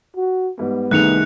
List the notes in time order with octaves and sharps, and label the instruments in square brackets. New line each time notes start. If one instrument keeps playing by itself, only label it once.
[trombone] F#4
[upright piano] G#2 G3 [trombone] B3
[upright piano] C2 D#3 [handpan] A3 D#4 G#4 [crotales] F#6 C#7 F7